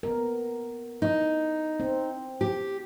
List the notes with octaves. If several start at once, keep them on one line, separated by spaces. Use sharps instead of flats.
B3 A#4
D#4
C4
G4